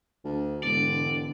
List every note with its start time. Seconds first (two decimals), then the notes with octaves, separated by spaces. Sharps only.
0.24 D2
0.63 E1 G#2 D3 D5